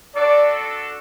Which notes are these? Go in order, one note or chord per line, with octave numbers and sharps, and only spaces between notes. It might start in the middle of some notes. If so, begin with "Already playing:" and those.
D4 F#4 A4 D5